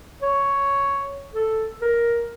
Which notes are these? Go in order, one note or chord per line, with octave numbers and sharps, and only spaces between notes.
C#5
A4
A#4